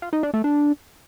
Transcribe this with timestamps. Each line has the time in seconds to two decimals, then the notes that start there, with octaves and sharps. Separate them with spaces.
0.02 F4
0.13 D#4
0.23 D4
0.34 A3
0.44 D4